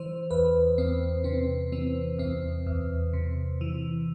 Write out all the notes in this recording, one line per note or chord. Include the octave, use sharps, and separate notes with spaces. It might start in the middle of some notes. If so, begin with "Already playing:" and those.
Already playing: E3 C5
E2 B4
E2 C4
C3 C4
E3 C4
E2 C4
E2
C3
E3